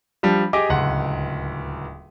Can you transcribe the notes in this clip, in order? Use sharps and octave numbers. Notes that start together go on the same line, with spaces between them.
F3 G3 D4
G4 G#4 D#5 D6
D1 C#2 F#5 C6